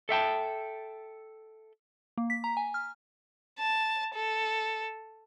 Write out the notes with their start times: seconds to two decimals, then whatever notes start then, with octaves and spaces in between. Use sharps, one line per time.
0.09 A4 E5 G5 A5
2.18 A#3
2.30 B6
2.44 A#5
2.57 G#5
2.74 F6
3.59 A5
4.15 A4